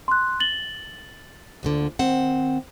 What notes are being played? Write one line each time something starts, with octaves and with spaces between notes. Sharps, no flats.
C6 F#6
A6 F#7 G7
D2 A#2 D3
D#3 C4 F#5